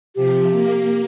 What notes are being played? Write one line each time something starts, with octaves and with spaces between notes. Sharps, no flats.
C3 F3 G4
A#3